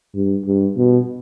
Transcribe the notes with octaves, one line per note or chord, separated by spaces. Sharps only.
G2
G2
B2